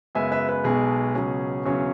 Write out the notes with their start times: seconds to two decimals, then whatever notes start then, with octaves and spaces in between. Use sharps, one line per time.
0.15 F#2 C#3 G#3 B3 E5 G#5
0.32 B4 E5
0.49 B4
0.64 B1 B2 G#3 B3 G#4
1.15 C#2 B2 F#3 C#4
1.64 E1 E2 C#3 F#3 C#4